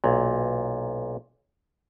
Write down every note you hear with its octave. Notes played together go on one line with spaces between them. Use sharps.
B1 A#2